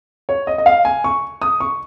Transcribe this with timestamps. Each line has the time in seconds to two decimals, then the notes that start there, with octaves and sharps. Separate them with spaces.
0.29 C#5
0.47 D#5
0.58 D#5
0.66 F5
0.85 G#5
1.04 C#6
1.42 D#6
1.60 C#6